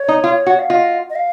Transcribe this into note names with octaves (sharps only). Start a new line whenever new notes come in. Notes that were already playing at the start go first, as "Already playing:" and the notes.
Already playing: C#5
D#4
F4
F#4
F5
F4 D#5
D#5
F5